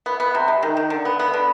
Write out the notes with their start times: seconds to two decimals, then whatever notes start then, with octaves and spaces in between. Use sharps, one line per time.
0.06 B3
0.20 B3
0.35 C3
0.48 G#3
0.63 D#3
0.77 D#3
0.90 D3
1.05 B3
1.19 B3
1.34 D3